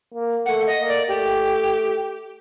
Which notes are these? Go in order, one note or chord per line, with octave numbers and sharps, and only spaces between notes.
A#3
A3 F#5
D#5
A#3
D5
A3 G4